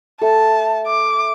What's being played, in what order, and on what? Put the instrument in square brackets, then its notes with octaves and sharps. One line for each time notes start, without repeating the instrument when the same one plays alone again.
[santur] A3 A4 [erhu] A5
[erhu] D6